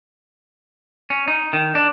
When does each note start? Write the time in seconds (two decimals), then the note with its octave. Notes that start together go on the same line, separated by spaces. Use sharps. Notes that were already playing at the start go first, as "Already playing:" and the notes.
1.10 C#4
1.28 D#4
1.53 D#3
1.75 D4